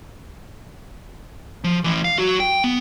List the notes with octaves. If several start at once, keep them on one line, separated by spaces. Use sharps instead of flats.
F3
A2 E3
F5
F#3 F#4
G5
B3